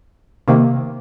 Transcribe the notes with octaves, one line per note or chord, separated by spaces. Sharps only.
C3 D#3 A#3